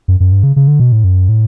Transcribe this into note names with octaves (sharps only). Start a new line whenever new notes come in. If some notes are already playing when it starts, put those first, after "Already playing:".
F#2
F#2
G2
C#3
C#3
D3
B2
A2
F#2
A2